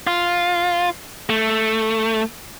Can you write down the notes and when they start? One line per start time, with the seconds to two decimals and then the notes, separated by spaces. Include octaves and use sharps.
0.07 F4
1.30 A3